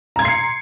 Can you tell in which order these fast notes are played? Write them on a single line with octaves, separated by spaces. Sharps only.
A#5 G#6 C6 C7 C#7